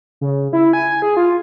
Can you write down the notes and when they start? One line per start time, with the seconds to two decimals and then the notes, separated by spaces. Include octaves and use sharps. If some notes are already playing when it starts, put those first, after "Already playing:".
0.21 C#3
0.53 E4
0.73 G#5
1.02 G#4
1.17 F4